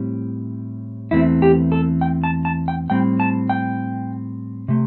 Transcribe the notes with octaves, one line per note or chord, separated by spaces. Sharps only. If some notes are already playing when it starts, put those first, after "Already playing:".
Already playing: A2 G3 C4
E2 E3 A3 C4 E4
G4
A4
G5
A5
A5
G5
A2 G3 C4 G5
A5
G5
C3 A3